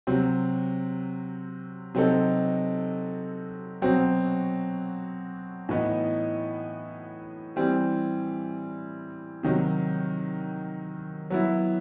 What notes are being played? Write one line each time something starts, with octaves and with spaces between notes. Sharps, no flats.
C3 F#3 C4
C3 F#3 C4 D#4 A4
B2 F#3 C4
A2 E3 B3 D#4
E3 G3 C4
C3 D#3 F#3
F#3 B3 E4